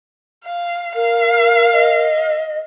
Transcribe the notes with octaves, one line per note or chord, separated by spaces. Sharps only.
F5
A#4 F5
D#5